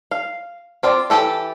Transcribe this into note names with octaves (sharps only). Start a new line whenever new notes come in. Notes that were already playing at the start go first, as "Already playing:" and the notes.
F5
C4 F4 D5
E3 F#3 G4 A4 E5